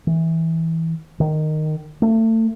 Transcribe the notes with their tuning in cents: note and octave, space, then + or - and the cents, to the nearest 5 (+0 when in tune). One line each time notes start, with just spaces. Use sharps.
E3 -15
D#3 -10
A3 +30